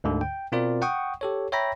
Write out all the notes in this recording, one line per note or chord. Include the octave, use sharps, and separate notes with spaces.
D2 G#2 D3
G5
B2 C4 F4 A#4 D5
F#5 G5 C#6 D#6
G4 A4 C#5
C#5 E5 G5 A#5 B5 A#6